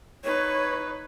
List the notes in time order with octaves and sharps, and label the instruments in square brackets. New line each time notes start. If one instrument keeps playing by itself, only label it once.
[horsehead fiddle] D#4 B4 [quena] C#5